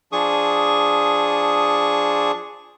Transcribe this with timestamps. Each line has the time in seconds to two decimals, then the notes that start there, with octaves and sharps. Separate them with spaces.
0.12 F3 D4 G#4 C#6 D#6